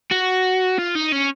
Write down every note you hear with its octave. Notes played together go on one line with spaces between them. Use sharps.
F#4
F4
D#4
C#4